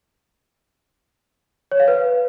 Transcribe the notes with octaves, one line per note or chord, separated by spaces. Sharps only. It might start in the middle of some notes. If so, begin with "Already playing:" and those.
C#5
F5
B4